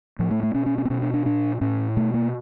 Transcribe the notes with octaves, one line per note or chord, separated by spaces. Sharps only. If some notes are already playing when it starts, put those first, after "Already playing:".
A2 F3
A3
A3
B2 C#4
C#4
C#4
C4
B2 C#4
D4
D4
A#2 D4
A2 C#4
B2 A3
A#3